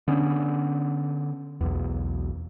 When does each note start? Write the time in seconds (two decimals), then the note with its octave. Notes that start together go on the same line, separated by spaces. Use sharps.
0.08 D3 B3 C#4
1.61 B1 E2